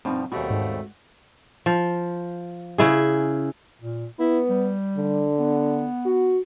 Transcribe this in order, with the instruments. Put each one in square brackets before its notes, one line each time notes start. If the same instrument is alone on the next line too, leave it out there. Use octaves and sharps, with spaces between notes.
[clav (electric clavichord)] G2 B2 F3 [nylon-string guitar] C4 D#4
[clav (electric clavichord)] D#2 B2 [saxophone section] G3 A3 C4 [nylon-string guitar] F#4
[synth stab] G#2
[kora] F3
C#3 E4 G#4
[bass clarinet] A#2
[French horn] B3 [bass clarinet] E4
[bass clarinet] G3
[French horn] D3
[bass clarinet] B3
[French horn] F#4